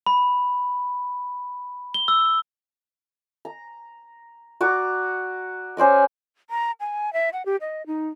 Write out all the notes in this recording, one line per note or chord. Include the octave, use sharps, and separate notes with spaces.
B5
G7
E6
A#5
F#4 D5 A#5
C#4 C5 D5 D#5
A#5
G#5
E5
F#5
G4
D#5
D#4